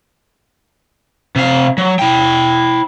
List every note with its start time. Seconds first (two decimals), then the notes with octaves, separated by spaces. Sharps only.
1.36 C3 F5
1.78 F#3
1.99 E4 G5